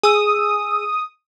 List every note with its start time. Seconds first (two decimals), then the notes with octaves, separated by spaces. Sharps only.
0.03 G#4 D#6 E6